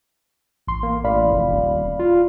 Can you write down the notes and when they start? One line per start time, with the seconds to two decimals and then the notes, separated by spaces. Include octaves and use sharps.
0.67 A1 C6
0.83 A#3
1.04 A1 D5 F5 B5
1.31 F1
1.50 D#1
1.99 F4